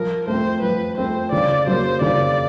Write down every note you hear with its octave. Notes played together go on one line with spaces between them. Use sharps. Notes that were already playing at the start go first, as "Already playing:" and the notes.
Already playing: F3 A#4
A3 C4 C5
F3 B4
A3 C4 C5
C#3 D5
F#3 A#3 C5
C#3 D5